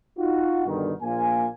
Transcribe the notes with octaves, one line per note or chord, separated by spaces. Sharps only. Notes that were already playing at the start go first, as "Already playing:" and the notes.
D#4 F4 F#4
G2 B2 D3 D#3
A#1 A#2 A#3 F4 G#5